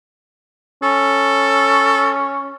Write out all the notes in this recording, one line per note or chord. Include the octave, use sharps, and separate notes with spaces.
C#4 A4